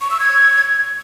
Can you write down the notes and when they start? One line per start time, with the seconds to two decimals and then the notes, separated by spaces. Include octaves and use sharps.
0.01 C#6
0.10 E6
0.20 G#6